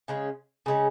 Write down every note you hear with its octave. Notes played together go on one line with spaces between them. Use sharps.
C#3 G#3 C#4
C#3 G#3 C#4